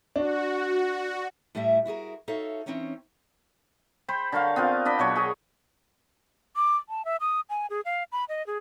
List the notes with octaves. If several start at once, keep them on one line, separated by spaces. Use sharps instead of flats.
D4 F#4
A2 G3 A3 E4 E5
E4 F#4 G#4 A#4
D#4 F#4 A4 C#5 E5 F5
E3 F#3 C4 C#4 D#4 C#5
C5 G5 B5
D3 A#4 C#5 F5
B3 C4 F4 A#4
D4 D#5 B5
B2 F#3 C#5
G#4 A#4 D#5
D6
A5
E5
D#6
G#5
G#4
F5
B5
D#5
G#4